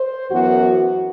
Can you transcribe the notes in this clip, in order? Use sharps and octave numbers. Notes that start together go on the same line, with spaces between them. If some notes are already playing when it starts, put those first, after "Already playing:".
Already playing: C5
F#2 E3 B3 F#4